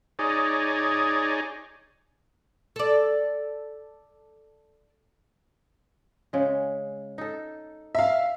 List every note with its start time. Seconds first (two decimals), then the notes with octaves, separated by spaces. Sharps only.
0.19 D#4 G#4 C#5 D5
2.76 A4 D5
6.33 C#3 G#3
7.18 D#4 A4
7.95 E5 F5